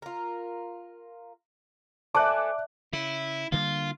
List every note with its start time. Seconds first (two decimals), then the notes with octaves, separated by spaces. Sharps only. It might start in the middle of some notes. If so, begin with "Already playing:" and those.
0.02 F4 A#4
2.15 A3 C5 D5 E5 G#5 A5 D6 F#6
2.93 C#3 E4
3.52 D3 G3 A#3 F4